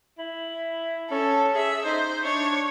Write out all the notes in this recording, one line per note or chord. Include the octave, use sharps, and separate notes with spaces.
E4
C#4 A4
G#4 E5
D#4 C5
D4 C#5